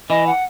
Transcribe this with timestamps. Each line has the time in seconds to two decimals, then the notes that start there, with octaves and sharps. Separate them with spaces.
0.09 E3 D#5
0.27 F#5